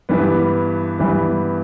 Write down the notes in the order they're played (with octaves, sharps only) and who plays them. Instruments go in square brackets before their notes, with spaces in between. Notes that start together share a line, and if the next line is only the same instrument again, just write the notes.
[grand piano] G2 E3 G3 B3
G2 E3 G3 B3